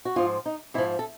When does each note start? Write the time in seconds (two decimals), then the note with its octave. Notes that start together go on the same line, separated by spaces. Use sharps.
0.05 F#4
0.16 G#2 F3 F4
0.46 D#4
0.74 G#2 F3 E4
0.99 A4